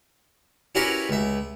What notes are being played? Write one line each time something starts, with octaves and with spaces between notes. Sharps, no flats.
C#4 E4 F#4 G4 A#4 B4
C#2 E5